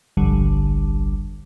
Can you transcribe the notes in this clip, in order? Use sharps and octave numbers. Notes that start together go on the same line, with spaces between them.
G1 C2 F2 D3 G3